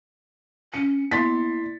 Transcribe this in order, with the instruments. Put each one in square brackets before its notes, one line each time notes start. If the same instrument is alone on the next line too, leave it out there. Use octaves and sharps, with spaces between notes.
[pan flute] C#4 [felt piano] C#7
[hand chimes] A#3 E4 D5 [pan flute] B3 [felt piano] C6 A6 B6